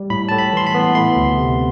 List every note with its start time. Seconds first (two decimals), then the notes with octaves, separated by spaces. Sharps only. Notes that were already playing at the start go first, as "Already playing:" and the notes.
Already playing: G3
0.10 A2 B5
0.29 A2 A5
0.38 B5
0.53 E3 C6
0.67 B5
0.74 B3
0.95 A3 C6
1.16 D2
1.38 C3